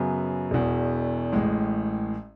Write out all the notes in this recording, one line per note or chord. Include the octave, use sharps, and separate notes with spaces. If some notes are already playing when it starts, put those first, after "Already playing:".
Already playing: F#2 C#3 F#3 B3
E1 E2 B2
A1 A2 G#3